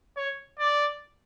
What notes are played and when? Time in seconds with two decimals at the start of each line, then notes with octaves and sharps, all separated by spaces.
0.17 C#5
0.60 D5